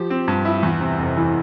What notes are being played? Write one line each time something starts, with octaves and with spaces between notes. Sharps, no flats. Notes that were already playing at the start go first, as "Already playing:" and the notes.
Already playing: F3 G4
C4
G2
E4
E2
C3
F1
E3